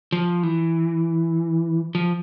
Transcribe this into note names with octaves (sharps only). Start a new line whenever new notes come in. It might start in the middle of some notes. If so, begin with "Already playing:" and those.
F3
E3
F3